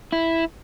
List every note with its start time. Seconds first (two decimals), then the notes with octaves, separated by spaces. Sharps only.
0.12 E4